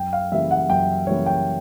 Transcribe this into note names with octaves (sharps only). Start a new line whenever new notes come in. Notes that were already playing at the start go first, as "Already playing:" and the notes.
Already playing: F#2 G5
F5
C#3 E3 G3 A#3 E5
F#5
F#2 G5
C#3 E3 G3 A#3 C#5
G5